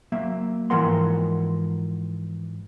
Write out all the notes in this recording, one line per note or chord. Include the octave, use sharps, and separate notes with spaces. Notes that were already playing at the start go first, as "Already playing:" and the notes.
F#3 A#3 E5
G#2 E3 F3 A#4 F#5 C6